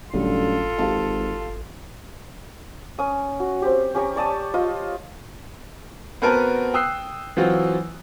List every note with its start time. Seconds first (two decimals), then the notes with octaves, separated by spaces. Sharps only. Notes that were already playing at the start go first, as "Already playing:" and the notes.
0.13 G1 F#2 A2 D3 G3 F4 A4
0.78 G#1 G4 F5 A5
2.99 C#4 D#6
3.40 F#4
3.62 C4 G4
3.94 C#4 G4 C#5 A#5
4.16 C#5 D5 A5 D#6
4.54 F4 D#5
6.22 B3 C4 F#4 A#4 B4 A5
6.74 G5 D#6 E6 F#6 C7
7.37 E3 F#3 C4 F4 F#4